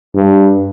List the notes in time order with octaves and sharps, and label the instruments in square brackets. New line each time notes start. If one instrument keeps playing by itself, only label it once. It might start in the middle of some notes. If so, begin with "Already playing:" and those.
[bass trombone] G2